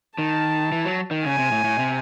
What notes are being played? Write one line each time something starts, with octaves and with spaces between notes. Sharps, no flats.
D#3 A5
E3
F#3
D#3
C#3 G#5
C3
A2
A2
C3